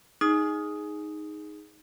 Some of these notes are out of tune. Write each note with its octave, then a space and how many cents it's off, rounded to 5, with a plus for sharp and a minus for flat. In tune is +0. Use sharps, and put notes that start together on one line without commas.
D#4 +0 G#4 +0 D#6 +0